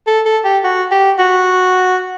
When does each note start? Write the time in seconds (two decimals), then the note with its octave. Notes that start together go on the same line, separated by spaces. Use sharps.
0.07 A4
0.25 A4
0.44 G4
0.64 F#4
0.91 G4
1.19 F#4